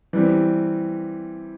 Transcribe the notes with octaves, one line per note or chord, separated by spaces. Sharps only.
E3 G3 C4